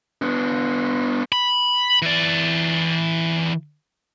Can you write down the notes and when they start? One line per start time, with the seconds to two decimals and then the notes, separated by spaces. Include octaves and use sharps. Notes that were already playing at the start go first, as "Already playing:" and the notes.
0.22 B3 D4
1.32 B5
2.02 E3 D5